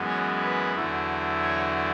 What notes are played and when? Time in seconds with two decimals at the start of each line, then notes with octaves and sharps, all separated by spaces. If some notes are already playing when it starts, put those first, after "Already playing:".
Already playing: F#2 E3 G#3 B3
0.08 C#5
0.42 B4
0.75 E2 D3 F#3 A3 E4
1.42 C#5